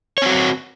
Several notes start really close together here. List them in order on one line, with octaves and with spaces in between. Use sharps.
C#5 C4 F#4